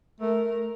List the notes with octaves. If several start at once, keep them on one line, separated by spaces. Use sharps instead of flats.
A3 A#4